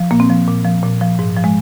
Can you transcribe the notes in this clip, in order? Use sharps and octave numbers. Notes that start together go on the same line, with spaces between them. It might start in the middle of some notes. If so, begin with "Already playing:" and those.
Already playing: F3
A#2 A#3
C4
F3
A#2
F3
A#2
F3
G#2
F3
G#3